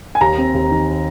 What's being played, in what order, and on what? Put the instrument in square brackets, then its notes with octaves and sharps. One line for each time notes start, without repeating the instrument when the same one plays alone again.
[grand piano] G#5
D#2 A#5
C4
D#2
D#3